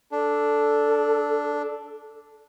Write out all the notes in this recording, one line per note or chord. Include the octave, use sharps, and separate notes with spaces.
D4 A4